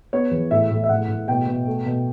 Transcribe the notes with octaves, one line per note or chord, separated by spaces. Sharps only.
B3 C#5
E2
A2 E5
A2
E5
A2 F#5
A2
B2 G5
B2
A3
B2